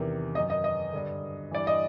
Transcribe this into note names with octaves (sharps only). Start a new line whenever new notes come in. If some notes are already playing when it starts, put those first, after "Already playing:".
Already playing: E2 C3 D#3
F#2 D#3 D#5
D#5
D#5
G2 D3
G2 E3 D5
D#5